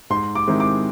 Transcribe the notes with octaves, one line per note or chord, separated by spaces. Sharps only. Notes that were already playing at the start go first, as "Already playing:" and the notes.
G#2 C6
D6
D#3 G#3 C4 E4
D6